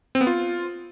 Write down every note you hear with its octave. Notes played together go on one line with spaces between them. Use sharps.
C4
B3
F4